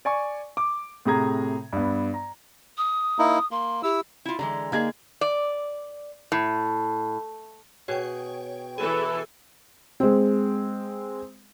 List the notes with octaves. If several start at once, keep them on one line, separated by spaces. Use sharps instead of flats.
D5 G#5 C#6
D6
A2 C3 G#4 A#5 G#6
G2 B3
A#5
D#6
A#3 D#4 E4
A#3 C6
E4 G4 E6
E4 F4
D3 E3 G#3 A#5
D3 A#3 D#4 G#4 G#6
D5
A2
B2 G#4 C#5 G5
E3 G#4 A4 B4
G#3 C4